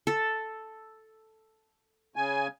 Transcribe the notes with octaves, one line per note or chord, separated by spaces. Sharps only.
A4
C#3 G#5